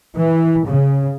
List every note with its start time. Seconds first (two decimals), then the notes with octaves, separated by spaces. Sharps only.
0.16 E3
0.67 C#3